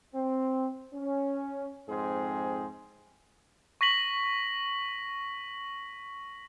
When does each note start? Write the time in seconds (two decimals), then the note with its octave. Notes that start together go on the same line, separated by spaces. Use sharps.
0.14 C4
0.93 C#4
1.89 F2 G#2 C4 G#4 C5
3.81 C#6 A#6 B6 F#7